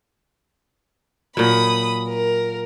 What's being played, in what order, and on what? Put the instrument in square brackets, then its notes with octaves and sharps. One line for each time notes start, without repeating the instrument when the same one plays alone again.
[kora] A#2 F#3 [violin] B5 D#6
[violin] A#4